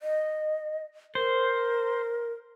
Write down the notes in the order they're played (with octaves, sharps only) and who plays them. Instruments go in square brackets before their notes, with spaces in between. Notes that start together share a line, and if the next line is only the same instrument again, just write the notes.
[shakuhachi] D#5
[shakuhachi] A#4 [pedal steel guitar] C5